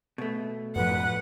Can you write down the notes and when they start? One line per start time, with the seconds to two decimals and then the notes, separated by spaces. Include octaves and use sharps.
0.18 B2 A3
0.76 F#2 A2 F3 B4 F#5